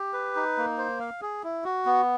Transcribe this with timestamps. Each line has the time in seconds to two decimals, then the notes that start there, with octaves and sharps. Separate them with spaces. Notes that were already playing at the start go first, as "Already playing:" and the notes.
Already playing: G4
0.13 B4
0.36 D#4
0.57 A#3
0.78 C5
1.00 F5
1.22 G#4
1.43 E4
1.64 F#4
1.86 B3